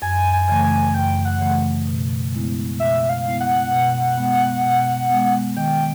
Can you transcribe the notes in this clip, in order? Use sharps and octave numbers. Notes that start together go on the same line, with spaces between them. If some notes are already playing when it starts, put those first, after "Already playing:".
F#2 G#5
G#5
C#3 E3 A3
G#5
F#2 G5
F#5
C#3 E3 A3
B2
G#3 B3 E4
B2 E5
F5
G#3 B3 E4
F#5
B2
G#3 B3
B2
G#3 B3
D#3 G5